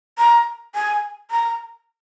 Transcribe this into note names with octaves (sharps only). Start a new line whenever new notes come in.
A#5
G#5
A#5